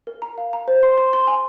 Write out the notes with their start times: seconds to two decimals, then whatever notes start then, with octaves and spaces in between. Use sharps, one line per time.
0.07 A#4
0.22 A#5
0.38 F5
0.53 A#5
0.68 C5
0.83 C6
0.98 C6
1.13 C6
1.27 G#5